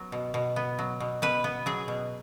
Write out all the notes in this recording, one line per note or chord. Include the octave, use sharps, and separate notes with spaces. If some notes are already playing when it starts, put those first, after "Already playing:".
Already playing: F#3 B3
B2
B2
B3
F#3
B2
B2 B4
B3
F#3 G#4
B2